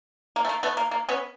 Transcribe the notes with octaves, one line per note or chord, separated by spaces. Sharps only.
A#3
A3
A#3
A3 B3
A#3
A#3
B3 C#4